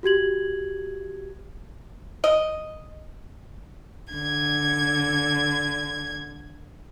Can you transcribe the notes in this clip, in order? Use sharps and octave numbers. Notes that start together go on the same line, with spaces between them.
F#4 G4 G#6 F#7
D#5
D3 G#6